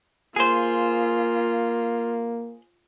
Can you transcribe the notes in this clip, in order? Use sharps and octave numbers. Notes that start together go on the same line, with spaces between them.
A#3 F4 G#4 C5